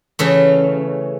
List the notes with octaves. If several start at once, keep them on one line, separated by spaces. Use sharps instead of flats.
C#3 E3 A3